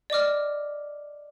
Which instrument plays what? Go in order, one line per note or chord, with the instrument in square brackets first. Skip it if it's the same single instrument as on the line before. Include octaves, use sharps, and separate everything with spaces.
[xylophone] D5 D#5 D6 F6